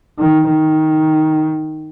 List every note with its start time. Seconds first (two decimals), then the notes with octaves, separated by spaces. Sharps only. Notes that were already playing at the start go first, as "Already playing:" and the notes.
0.19 D#3
0.50 D#3